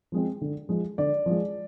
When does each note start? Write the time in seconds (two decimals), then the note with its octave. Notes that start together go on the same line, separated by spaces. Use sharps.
0.12 F3 G#3 C4
0.41 D3
0.69 F3 G#3
0.98 D3 D5
1.26 F3 G#3